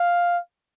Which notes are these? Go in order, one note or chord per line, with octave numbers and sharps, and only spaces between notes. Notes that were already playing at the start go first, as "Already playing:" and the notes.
Already playing: F5